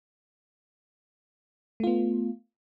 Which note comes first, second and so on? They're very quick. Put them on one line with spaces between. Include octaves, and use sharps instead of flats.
A3 F4 B3